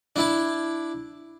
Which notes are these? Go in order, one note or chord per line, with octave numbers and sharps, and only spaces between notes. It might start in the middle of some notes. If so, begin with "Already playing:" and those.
D4 E4 A5